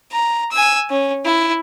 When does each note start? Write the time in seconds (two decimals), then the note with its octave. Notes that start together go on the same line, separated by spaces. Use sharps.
0.12 A#5
0.51 G#5 E6
0.90 C#4
1.25 E4